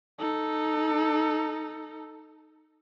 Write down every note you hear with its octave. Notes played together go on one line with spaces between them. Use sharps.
D#4 A4